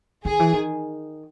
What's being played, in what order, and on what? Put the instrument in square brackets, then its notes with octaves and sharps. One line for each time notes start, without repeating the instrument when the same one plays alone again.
[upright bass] D#3 [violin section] G#4
[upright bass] E3
D#3